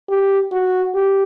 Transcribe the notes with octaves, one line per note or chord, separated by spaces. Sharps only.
G4
F#4
G4